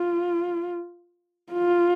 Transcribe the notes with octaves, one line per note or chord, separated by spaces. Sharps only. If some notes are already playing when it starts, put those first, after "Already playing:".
Already playing: F4
F4